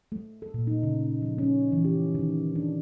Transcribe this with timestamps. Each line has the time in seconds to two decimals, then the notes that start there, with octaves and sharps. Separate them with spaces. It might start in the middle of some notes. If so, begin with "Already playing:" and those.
0.12 A3
0.42 A4
0.54 A#2
0.67 D#4
0.83 C#3
1.22 F3
1.38 C#4
1.72 E3
1.85 G4
2.15 D#3
2.56 D4